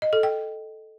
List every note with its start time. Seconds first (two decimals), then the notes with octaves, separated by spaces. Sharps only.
0.02 D#5
0.13 A4
0.23 G5